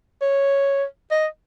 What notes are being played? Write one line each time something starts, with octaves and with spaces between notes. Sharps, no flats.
C#5
D#5